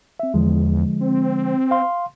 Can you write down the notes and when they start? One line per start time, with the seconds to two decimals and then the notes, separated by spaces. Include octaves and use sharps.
0.19 C4 E5
0.34 E2 D3 F3 G#3
1.01 C4
1.71 F5 C6